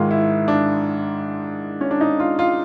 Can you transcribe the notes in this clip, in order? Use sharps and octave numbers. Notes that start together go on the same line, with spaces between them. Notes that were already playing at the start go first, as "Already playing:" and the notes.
Already playing: G#2 D#3 G#3 F4
E4
D4
C#4
D4
D#4
F4
F4